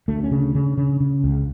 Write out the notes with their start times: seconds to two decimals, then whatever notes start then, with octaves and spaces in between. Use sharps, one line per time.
0.08 D2 A3
0.23 C#4
0.31 C#3
0.39 D4
0.55 C#3
0.77 C#3
1.00 C#3
1.24 C#2